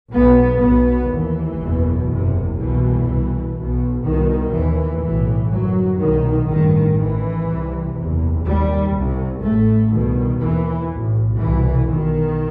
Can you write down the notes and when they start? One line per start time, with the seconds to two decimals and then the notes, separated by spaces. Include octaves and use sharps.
0.10 B1 B2 B3
0.59 B1 B2 B3
1.08 D#2 E3
1.58 F#1 E2 B2
2.07 F#1 E2 C3
2.55 C2 B2 E3
3.05 C2 B2
3.54 B1 B2
4.03 C2 B2 D#3
4.52 D#2 E3
5.01 B1 A2 E3
5.50 G1 F#2 F#3
5.99 C2 B2 D#3
6.48 A1 G2 D#3
6.97 A1 A2 E3
7.46 C2 C3
7.95 F#1 E2 C3
8.44 D#2 G3
8.93 C2 C3
9.42 A1 A2 A3
9.91 C2 B2 D#3
10.41 D#2 E3
10.90 B1 A2
11.38 C2 B2 E3
11.88 B1 B2 D#3